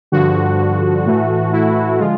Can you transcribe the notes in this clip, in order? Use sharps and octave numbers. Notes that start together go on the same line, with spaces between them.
G2 D3 F3 F#4
A2 E3 A3
E4
D3 F3 G#3 F4